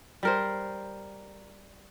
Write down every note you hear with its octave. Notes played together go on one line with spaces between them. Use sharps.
G3 A#4 C5